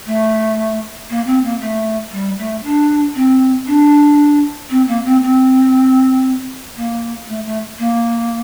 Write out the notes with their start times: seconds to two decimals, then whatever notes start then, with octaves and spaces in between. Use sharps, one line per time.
0.06 A3
1.09 A#3
1.26 C4
1.43 A#3
1.60 A3
2.11 G3
2.38 A3
2.64 D4
3.15 C4
3.66 D4
4.70 C4
4.87 A#3
5.04 C4
5.21 C4
6.76 A#3
7.28 A3
7.45 A3
7.78 A#3